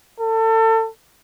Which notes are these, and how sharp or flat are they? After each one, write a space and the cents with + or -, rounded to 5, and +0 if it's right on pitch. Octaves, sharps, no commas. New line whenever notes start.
A4 +30